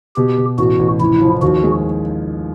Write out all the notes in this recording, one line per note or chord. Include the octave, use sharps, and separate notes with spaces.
B2 G4
B2
A1 F#4
A1
F1 E4
F3
D#2 F#4
G#3